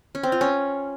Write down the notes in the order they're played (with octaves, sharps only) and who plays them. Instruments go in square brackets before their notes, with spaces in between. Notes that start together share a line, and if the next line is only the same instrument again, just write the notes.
[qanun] C#4
C4
F4
C#4